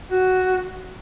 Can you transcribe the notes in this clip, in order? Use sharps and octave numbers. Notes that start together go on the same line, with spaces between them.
F#4